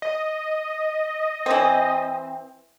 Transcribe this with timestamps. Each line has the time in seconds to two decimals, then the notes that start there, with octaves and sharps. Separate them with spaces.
0.02 D#5
1.46 E3 C4